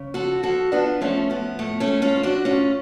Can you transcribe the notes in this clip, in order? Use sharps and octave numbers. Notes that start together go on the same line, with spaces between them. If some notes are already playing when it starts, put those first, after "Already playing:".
Already playing: C#3
F3 F#4 A4
F3 F#4 A4
F3 B3 D4
F3 A3 C#4
F3 B3
A2 A3
A3 C#4
A2
C#4 F4
F3
D4 F#4
A2 C#4 F4